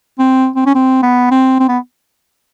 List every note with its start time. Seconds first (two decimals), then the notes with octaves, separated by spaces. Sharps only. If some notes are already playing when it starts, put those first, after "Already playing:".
0.19 C4
0.56 C4
0.66 C#4
0.75 C4
1.03 B3
1.31 C4
1.60 C4
1.69 B3